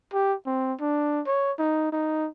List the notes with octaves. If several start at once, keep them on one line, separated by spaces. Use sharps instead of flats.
G4
C4
D4
C#5
D#4
D#4